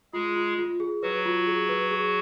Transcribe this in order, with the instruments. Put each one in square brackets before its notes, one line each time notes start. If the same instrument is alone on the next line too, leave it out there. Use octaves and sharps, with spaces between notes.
[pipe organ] G#3 G#4 [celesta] F4
[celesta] F4
F4
G#4
[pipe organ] F#3 F#4 [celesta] B4
[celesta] F4
G#4
B4
G#4